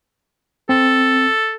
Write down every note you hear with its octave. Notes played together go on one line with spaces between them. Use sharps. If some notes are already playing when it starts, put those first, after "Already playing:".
C4 A4